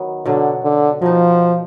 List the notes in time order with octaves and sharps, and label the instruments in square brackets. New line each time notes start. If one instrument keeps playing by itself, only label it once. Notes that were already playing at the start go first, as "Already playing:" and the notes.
Already playing: [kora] D#3 F#3 B3
[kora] B2 F#3 D4 [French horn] D3
[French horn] D3
[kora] B2 A#3 D#4 [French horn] F3